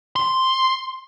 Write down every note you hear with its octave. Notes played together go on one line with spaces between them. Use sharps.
C6